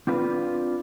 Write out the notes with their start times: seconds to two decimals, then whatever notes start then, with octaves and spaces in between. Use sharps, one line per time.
0.07 C4 D4 F4 B4